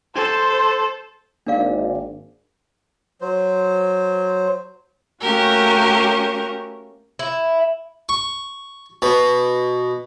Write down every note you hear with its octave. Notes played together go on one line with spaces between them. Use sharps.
A4 C5
G#1 A#3 D4 A#4 D5 F5
F#3 C5
A3 A#3 C#4 F#4 G4 A#4
E4
C#6
B2